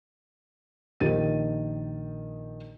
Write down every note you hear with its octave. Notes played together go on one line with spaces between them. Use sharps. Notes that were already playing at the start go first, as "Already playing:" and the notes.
A#1 D#3 G4 D#5 A6 D#7